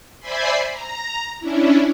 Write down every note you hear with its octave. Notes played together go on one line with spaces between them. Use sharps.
C5 D5 E5 G#5 B5 C6
A#5
C#4 D4 E4